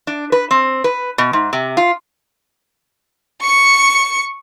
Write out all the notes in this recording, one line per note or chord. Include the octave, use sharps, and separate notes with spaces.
D4
B4
C4
B4
B2
G#2
C3
F4
C#6 C#7